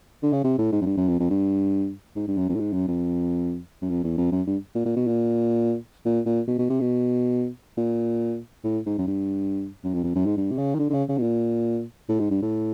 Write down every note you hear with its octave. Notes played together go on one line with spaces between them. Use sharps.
D3
C#3
C3
A2
G#2
F#2
G2
F#2
F2
F2
G2
G#2
G2
F#2
F2
A2
G#2
F#2
F2
F#2
F2
E2
F2
F#2
G2
A#2
A#2
B2
A#2
A#2
A#2
B2
B2
C3
B2
A#2
A2
G#2
F#2
G2
F#2
F2
F2
F#2
G#2
G2
C3
C#3
D#3
D3
D3
C#3
C#3
B2
A#2
A2
G#2
G2
A2